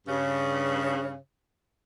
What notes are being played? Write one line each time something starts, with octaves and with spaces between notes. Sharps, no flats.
G2 C#3